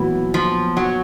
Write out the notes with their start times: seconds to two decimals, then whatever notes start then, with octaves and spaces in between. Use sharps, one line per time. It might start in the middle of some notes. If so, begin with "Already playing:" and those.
Already playing: A#2 E3 F#3 B3
0.34 F3
0.77 F#3